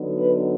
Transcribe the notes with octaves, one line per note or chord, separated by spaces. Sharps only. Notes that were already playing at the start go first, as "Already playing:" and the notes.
Already playing: D3 F#3 B3 D#4
B4